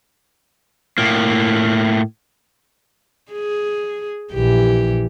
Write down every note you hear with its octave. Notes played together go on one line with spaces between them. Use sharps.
A2 A#3
G#4
A#1 E3 G4